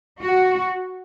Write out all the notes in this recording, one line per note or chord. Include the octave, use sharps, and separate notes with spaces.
F#4